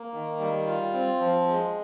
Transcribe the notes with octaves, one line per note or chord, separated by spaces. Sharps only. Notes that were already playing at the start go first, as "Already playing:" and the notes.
Already playing: A#3
D#3
G3
F4
C4
F3
G#3